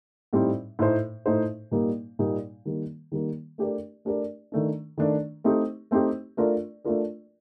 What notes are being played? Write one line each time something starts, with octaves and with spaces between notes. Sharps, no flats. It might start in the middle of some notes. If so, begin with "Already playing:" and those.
A2 G3 C4 D#4
A2 A3 D#4 A4 C5
A2 A3 D#4 A4 C5
A#2 G3 A#3 D#4
A#2 G3 A#3 D#4
D#3 G3 A#3
D#3 G3 A#3
A3 D4 G4 A#4 D5
A3 D4 G4 A#4 D5
D#3 A3 D4
D#3 A3 D4
A3 C4 D#4 G4
A3 C4 D#4 G4
A3 D4 F4 A#4 D5
A3 D4 F4 A#4 D5